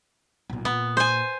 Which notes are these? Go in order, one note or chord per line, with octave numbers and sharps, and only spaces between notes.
B1 A#2
A#2 B3
C5 G#5